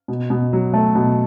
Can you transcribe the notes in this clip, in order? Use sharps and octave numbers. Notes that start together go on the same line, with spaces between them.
B2
B2
F#3
A3
B2